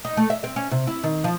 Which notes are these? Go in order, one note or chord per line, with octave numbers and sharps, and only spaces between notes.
D#4
A3
E5
C4
C#4
C3
E4
D#3
F3